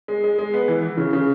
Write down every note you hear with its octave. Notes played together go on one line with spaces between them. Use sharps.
G#3
G#3
G#3
B3
E3
E3
C#3
C#3